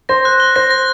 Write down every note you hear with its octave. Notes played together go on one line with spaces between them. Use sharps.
C5 A#6
F#6
G7
C5 A#6
A#6